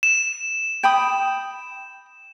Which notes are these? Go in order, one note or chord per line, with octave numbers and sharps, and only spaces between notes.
E7
G5 B5 D#6